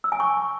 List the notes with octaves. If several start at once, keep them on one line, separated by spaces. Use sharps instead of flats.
E6
G#5
C#6